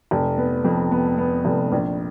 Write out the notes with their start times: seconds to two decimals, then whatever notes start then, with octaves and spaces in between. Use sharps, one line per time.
0.11 F1
0.37 B3
0.64 F2
0.91 B3
1.18 B3
1.45 F1
1.72 A#1